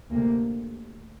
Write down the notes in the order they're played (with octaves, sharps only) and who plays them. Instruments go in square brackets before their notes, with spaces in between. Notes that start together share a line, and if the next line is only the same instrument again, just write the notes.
[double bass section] D2 C3 A#3